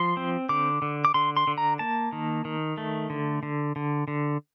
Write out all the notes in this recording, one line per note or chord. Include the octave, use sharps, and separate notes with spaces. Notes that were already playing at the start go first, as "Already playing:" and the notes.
Already playing: F3 C6
C4
D3 D6
D3
D6
D3 C6
C6
D3
A#5
A#3 A5
D#3
D#3
A3
D3
D3
D3
D3